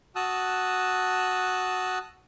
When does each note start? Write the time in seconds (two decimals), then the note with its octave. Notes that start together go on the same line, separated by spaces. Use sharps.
0.16 F#4 A5 D#6 E6 F#6